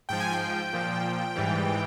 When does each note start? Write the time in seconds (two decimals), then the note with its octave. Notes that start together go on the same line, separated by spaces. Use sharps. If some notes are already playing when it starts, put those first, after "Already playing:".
0.09 G#2 F3 G5
0.20 G#5
0.32 G5
0.73 A#2 F3
1.36 G#2 E3 G3